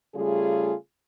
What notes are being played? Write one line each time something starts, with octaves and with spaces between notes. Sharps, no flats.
C#3 G3 A3 F4 G#4